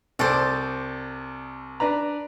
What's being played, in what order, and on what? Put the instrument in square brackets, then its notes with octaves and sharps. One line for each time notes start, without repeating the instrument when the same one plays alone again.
[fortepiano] C2 A4 D6 [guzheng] C5 D5
[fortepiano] D4 B4 A#5